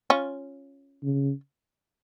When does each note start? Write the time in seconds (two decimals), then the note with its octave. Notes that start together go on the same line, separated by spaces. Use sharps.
0.10 C#4 F4
1.03 C#3